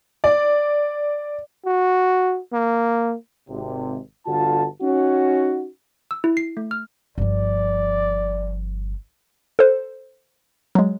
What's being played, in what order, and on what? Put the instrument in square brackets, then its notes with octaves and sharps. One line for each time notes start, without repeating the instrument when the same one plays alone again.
[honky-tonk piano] D5
[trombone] F#4
A#3
[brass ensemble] G#1 C3
G1 D3 F4 F#4 A5
C#4 D#4 F#4
[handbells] E6
E4
C7
A3
F6
[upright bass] G1 F3 [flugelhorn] D5
[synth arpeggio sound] A4 C5
F#3 G#3